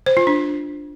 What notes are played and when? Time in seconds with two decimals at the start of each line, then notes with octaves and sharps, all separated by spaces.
0.06 C5
0.17 F4
0.27 D4